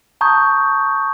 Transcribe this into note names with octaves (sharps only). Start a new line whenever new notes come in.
A5 A#5 C#6 D#6 G6 G#6